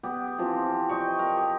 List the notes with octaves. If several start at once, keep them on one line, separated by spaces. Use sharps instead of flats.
B3 G4
E3 F3 C4 F4
D#5 G5 C#6
A#4
G4